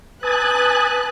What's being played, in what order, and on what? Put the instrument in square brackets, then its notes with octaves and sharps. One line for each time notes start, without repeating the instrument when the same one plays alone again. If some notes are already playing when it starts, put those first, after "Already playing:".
[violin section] B4 F#6 [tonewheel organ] G#5 A5 D#6